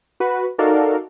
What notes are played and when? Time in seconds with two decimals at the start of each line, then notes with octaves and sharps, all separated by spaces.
0.20 F#4 B4
0.58 D#4 F#4 A4 A#4 D5 F5